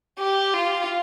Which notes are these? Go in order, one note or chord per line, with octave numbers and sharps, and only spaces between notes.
G4
F4